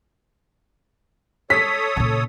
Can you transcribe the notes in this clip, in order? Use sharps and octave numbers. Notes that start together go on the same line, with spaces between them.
A4 C#5 D#6 B6
A#2 C#3